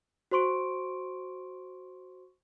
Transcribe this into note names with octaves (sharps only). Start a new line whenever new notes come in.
F#4 C5 C6 C#6 D7